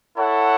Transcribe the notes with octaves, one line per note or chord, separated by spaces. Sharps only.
E4 A4 C#5 F#5